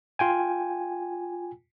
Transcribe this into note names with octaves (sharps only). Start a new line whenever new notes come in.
F4 G5 G#5